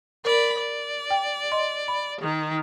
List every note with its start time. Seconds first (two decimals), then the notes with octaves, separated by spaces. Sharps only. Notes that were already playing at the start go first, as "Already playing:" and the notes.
0.25 A#4 D5 B5
0.58 D5
1.10 G5
1.52 D#5 C6
1.88 B5
2.21 D#3